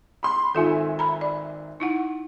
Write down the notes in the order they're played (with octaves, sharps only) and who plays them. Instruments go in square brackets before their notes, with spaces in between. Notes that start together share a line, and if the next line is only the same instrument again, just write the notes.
[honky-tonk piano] B5 C6
[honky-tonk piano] G#1 E5 G#5 [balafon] D#4 F4 A4
[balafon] A#5 B5
D5
D#4 E4 F#5